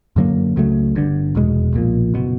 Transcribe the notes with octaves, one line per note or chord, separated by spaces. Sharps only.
F#2 D3 F#3 A#3
C#2 C#3 F#3 A3
G1 G2 D3
F1 E2 B2 G#3
B1 A#2 F3
F#1 B2